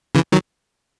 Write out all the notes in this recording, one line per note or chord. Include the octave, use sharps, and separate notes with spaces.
C#3 E3
D#3 F#3